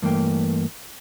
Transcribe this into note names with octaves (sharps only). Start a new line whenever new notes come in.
G2 E3 A3 A#3 G5